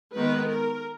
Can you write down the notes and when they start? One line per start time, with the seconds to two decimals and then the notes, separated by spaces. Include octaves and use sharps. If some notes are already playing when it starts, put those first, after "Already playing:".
0.15 D#3 G#3 B3 B4
0.48 A#4